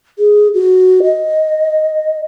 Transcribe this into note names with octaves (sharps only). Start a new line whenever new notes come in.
G#4
F#4
D#5